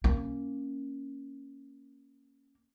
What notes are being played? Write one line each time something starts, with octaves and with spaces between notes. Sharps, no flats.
A#3 C#4